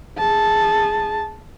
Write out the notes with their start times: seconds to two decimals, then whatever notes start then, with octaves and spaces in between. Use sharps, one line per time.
0.18 G#4 A5